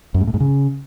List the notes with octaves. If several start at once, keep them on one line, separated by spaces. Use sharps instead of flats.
F#2
G#2
A2
G#2
C#3